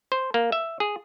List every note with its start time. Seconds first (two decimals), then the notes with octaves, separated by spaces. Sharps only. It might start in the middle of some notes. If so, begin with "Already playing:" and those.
0.12 C5
0.34 A#3
0.52 E5
0.80 G#4